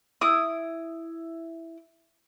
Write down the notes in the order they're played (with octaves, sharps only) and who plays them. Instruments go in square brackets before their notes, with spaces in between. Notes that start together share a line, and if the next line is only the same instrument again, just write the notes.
[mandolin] E4 D#6